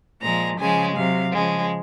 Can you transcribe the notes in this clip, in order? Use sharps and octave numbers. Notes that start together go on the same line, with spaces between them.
A#2 F3 G#3 A#5
C#3 F3 G#3 G#5
C3 F#3 F5
C#3 F3 G#3